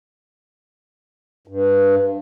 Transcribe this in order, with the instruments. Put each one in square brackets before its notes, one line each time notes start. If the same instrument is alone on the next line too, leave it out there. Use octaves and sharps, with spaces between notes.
[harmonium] G2